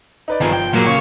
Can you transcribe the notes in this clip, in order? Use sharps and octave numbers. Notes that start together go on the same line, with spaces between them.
D#4 B4 D5
G1 D#3 F3 G#4 A#5
G5
A#2 F#3 A#3 G#4
C#3 C#5 F5 C#6